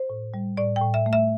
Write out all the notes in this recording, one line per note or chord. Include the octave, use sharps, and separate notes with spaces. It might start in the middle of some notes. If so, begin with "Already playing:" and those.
Already playing: C5
A2
G3
A2 D5
G5
A2
E5
A3
E5